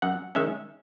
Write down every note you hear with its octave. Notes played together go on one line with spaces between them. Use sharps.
F#2 F#5
D#3 G#3 C#4 E5